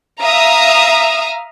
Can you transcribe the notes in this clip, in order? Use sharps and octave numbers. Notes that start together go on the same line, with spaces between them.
E5 F5 A#5 D#6